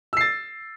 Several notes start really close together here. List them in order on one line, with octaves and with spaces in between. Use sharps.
E6 C7 A6